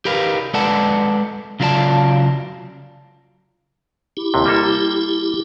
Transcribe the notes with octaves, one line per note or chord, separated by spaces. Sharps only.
G4 A#4 B4 F5
G#3 A4 B4 D5 F#5 A5
C#3 F#3 F4 G4 D5 A5
E4 G4
D#2 C3
G3 A#3 A4